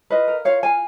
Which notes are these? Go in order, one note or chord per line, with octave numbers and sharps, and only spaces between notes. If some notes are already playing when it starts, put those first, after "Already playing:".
F4 B4 D#5
A#4
F4 C#5 F5
F4 F5 G#5